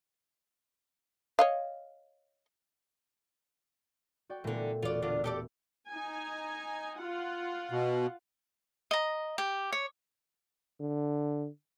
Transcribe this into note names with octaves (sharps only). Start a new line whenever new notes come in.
C#5 D#5 F5
F#4 D5 G5
A#2 D3 E3 A3 B3
E1 F4 F#4 D5
D3 D4 F4
G4 A4 D5
D#4 G#5
F4 F#5
B2
D#5 A#5
G4
C#5
D3